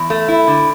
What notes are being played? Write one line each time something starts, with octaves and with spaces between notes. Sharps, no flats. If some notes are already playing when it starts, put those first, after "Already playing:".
Already playing: E2
A3
E4
D3